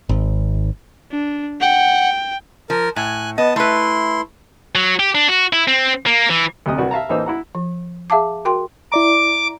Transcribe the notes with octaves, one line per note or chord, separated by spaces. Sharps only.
G#1
D4
F#5 G5
F3 A#4
A2 G#5 F#6
B3 D#5 A5
A3 E4 B4 C6
F#3
G4
D4
F#4
E4
C4
A#3
E3
D2 C3 D#5 D#6
C2 F#4 B4 D5
E5 F5 A5 A#5
A1 E3 A#3 D#4 C5 E6
E4 F#5 A#5
F3
G#4 E5 F5 A5 D6
F#4 A#4 G5 C6
E4 D5 A#5 D6